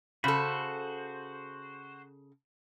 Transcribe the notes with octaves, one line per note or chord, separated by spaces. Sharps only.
C#3 F#4 A4 C5 B5